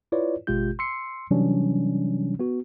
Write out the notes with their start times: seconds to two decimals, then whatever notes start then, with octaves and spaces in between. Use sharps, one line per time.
0.12 E4 F4 B4 C#5 D5
0.47 G#1 B2 G#3 F4 G4 G6
0.79 C6 E6 C7 C#7
1.31 C3 E3 F#3 G3 C#4 D4
2.39 B3 F#4